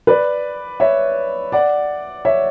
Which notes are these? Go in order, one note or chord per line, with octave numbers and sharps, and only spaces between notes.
B4 D5
C#5 E5
D5 F#5
C#5 E5